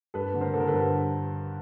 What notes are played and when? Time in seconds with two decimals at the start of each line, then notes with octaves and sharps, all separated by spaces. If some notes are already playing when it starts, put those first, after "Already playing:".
0.14 G2 A4 B4
0.34 D3
0.40 A#4 C5
0.54 D3 A4
0.60 A#4
0.67 A4 B4
0.74 G2